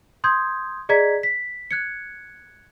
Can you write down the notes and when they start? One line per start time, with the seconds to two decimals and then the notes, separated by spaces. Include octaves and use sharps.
0.24 C6 D#6 G6 G#6
0.89 G#4 D5 D#5 A#5 G#6 B6
1.23 B6
1.71 F#6 G#6 C#7